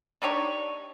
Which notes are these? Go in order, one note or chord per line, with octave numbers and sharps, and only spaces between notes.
D4 D#4 G4 C#5